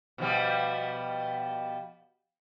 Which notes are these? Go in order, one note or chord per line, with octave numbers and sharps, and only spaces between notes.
B2 F3 G3